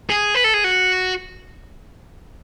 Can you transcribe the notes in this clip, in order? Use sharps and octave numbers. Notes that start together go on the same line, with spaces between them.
G#4
B4
A4
G#4
F#4